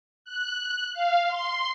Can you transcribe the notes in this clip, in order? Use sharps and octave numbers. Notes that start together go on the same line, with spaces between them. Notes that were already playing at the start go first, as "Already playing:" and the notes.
F#6
F5
C6